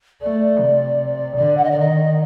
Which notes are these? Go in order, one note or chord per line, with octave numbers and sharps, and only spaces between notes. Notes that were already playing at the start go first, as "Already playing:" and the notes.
A3 D5
C3
D3 D5
F#5
D#5
D5
D#3 D#5